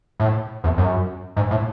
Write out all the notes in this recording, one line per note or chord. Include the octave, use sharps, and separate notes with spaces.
A2
E2
F#2
G#2
A2